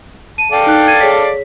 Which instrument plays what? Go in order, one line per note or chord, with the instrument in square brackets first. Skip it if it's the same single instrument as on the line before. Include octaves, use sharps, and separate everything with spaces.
[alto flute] A5 [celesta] D#7
[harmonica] A4 D5 F5 [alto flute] G5
[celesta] D#4 F#6
G#6 A6 D#7
G#4 C#5 B6